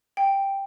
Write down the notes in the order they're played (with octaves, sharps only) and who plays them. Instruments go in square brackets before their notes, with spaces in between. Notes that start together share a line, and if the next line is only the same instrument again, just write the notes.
[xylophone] G5